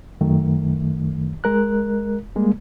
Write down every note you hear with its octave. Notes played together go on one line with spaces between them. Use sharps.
F#2 D#3 A3
G#3 A#4 F#6
G3 G#3 A#3